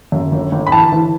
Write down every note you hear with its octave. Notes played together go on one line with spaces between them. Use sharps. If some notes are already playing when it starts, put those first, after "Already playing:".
F#2
G1
G1
B5
E3 A5
E3